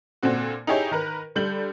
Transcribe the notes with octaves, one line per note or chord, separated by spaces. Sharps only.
A#2 D3 C4 F#4
D#4 E4 G4 G#4 C#5
D#3 A#4 B4
D3 G3 G6 F#7